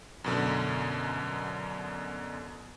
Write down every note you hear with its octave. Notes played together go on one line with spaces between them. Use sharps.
F#2 B2 D3